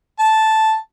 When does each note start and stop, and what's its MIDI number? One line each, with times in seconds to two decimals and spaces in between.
0.20 0.75 81